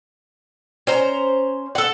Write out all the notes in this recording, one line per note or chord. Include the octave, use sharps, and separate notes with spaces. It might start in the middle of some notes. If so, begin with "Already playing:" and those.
C#4 C5 A#5
A4 F#5